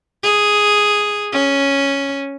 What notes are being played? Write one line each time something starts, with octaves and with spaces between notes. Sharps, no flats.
G#4
C#4